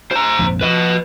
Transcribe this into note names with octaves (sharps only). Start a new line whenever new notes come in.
C5 A#5
A#1 F2 G#2
F3 B4 D#5